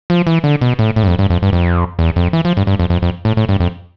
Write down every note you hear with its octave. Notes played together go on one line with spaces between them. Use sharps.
F3
E3
D3
B2
A2
A2
G2
F2
G2
F2
G2
F2
E2
F2
E3
F3
G2
G2
F2
F2
F2
A2
A2
G2
F2